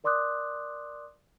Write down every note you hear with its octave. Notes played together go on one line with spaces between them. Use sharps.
A#4 D5 C6 D6 D#6 F#6